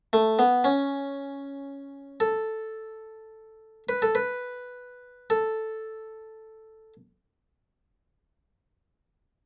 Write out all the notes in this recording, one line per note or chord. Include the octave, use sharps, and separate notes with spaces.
A3
B3
C#4
A4
B4
A4
B4
A4